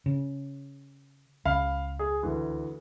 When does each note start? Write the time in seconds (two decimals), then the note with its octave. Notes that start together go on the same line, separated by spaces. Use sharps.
0.06 C#3
1.45 C#2 F5 B5
1.99 G#4
2.23 D2 E3